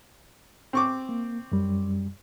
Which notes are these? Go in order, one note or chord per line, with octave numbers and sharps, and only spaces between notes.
C4 C#6 D6
A#3
F#2 G3